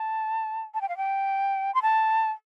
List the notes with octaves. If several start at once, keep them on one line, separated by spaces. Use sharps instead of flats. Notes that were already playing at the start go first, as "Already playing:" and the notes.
Already playing: A5
A5
G5
F5
G5
C6
A5